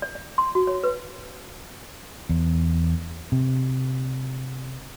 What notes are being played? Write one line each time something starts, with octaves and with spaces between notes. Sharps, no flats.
D5
D5
C6
F#4
C#5
B4
E2
C3